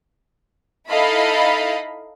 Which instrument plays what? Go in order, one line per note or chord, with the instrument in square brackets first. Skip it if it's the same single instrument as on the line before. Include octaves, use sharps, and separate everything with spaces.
[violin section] D#4 E4 A4 D#5 F5 B5